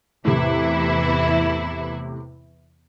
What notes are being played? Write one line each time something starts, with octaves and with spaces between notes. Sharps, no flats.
E2 A2 C3 E3 E4